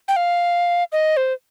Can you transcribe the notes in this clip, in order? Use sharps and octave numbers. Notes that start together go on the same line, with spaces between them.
G5
F5
D#5
C5